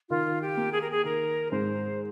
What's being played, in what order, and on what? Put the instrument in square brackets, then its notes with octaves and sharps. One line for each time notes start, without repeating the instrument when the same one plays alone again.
[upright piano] D#3 [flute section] F4
[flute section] G4
[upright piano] A#3
[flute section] G#4
A#4
G#4
[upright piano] D#3 [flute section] A#4
[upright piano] G#2 [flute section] C5